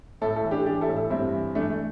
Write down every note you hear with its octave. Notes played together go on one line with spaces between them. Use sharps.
A2 E4 A4
E4 A4
E3
D4 G4
E3 D4 G4
E4 A4
A2
E4 A4
G2 C4 E4
E3
E3 A3 D4
A3